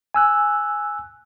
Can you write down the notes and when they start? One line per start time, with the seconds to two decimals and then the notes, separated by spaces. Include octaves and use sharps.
0.14 G#5 E6 F#6